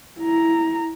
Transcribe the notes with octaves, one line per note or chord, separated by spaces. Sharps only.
E4 A#5